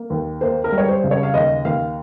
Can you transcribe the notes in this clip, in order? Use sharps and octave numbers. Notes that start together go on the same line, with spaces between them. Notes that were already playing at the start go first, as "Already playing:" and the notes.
Already playing: A#3
D#2
A#3 C5
A#4
G3
C#5
C5
C#3
C#5
F5
D#2 D#5
D#2 F5